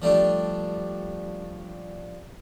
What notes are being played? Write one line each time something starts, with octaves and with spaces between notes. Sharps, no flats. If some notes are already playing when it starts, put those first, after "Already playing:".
F3 G3 A3 D4